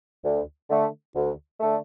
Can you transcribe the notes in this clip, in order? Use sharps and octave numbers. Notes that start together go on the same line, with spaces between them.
D2
D3 A3
D2
D3 A3